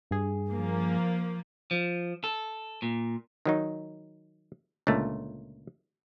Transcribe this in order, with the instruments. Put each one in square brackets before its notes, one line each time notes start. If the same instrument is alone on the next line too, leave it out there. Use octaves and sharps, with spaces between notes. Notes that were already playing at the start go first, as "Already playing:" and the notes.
[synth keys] G2 G#4
[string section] F3 A#3
[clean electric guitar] F3
A4
A#2
[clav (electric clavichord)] D#3 F#3 D#4
C#2 A#2 D3 A3